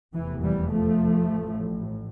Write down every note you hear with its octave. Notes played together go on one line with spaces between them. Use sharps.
F1 E2 C3 E3
E3 G3
F3 A3
A1 A2